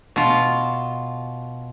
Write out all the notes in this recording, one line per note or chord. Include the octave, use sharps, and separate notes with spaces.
B2 F4 F5